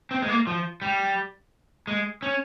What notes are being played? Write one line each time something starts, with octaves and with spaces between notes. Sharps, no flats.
C4
G#3
A#3
F3
G3
G#3
C#4